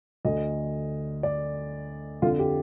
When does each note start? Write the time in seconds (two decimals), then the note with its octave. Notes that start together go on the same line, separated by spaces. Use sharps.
0.25 D2 D3 D#5
1.23 D5
2.22 F2 D3 F4
2.39 G4